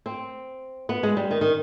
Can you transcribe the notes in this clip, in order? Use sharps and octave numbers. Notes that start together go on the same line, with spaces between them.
C4
B3
G#3
G3
D#3
D#3